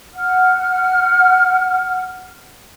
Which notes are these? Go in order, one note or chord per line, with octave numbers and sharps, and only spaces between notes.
F#5 F6